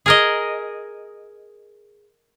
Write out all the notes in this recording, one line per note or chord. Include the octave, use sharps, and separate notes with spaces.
G#4 A#4 D#5